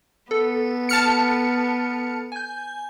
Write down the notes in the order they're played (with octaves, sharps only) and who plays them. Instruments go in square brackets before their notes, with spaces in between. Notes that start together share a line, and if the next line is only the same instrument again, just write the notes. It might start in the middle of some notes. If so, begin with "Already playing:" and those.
[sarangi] B3 [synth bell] A4
[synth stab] A5 F6 C#7
[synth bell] G#5 G6